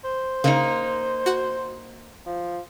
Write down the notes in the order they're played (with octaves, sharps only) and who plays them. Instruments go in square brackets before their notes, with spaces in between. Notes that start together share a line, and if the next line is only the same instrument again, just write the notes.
[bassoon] C5
[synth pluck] C#3 [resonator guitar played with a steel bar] A#3 D#4
[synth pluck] F#4 F#5
[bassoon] F3